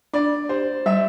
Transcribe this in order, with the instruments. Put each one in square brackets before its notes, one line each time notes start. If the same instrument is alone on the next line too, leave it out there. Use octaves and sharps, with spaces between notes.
[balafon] D4 [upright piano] D5
[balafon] G4 [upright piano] C5
[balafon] G3 [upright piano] E5